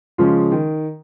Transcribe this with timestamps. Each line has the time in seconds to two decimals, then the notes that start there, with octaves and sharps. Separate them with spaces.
0.18 C#3 F3 G#3 C#4 F4
0.52 D#3